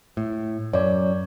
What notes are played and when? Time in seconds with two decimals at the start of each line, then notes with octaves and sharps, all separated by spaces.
0.17 A2
0.73 F#2 C#5 D5